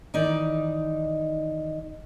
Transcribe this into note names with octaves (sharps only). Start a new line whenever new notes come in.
D#3 E3 D#4 D5